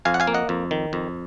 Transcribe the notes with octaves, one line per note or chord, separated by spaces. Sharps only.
F2 F5 G#5
F#5
F5 G#5
A#3
D#5 F#5
F2
D#3
F2